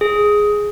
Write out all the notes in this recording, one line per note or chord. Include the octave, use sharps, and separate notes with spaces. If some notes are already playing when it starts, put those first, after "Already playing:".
G#4